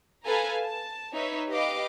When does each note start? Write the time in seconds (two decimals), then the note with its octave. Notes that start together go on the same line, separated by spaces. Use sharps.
0.24 A4 B4 F5 G#5 A#5
0.59 A5
1.14 D#4 B4 C#5 E5
1.49 G4 B4 D#5 F5 D6